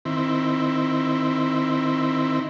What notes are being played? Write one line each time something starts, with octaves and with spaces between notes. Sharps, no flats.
D#3 C4 E4